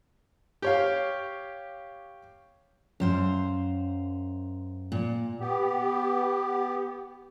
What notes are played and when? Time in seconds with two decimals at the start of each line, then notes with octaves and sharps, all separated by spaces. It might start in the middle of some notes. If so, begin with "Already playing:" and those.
0.62 G4 C#5 F5
3.00 F#2 C5 F5
4.92 A#2
5.40 B3 G4